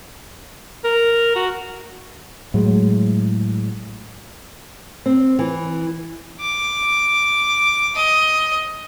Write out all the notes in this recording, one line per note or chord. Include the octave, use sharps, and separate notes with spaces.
A#4
F#4
A2 F#3 G#3
C4
E3
D6
D#5